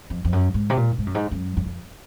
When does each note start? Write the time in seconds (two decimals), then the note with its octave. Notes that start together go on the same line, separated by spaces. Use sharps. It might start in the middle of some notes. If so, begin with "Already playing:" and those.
0.10 F2
0.25 F2
0.33 F#2
0.54 G#2
0.70 C3
0.77 A#2
0.98 G#2
1.07 F#2
1.15 G#2
1.31 F#2
1.57 F#2
1.66 F2